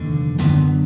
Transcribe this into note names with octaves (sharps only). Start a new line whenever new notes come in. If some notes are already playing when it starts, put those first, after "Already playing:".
Already playing: F1 D#2 D3
F#2 D3 F#3 B3